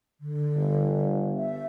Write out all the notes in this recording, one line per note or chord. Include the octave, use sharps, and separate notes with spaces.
D3
G1
E5